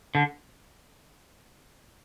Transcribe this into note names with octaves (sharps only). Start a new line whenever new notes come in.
D3